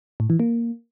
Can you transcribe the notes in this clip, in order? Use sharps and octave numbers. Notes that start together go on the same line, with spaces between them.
A2
E3
A#3